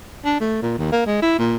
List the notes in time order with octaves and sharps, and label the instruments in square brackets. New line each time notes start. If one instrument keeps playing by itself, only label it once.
[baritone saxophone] D4
A3
A#2
D#2
A#3
G#3
E4
A#2